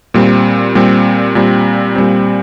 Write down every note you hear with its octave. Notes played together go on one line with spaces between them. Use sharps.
A#2 G3 C4
A#2 G3 C4
A#2 G3 C4
A#2 G3 C4